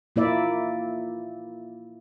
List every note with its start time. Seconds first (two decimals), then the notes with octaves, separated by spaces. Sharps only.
0.16 A#2 A#3 E4 D5 E5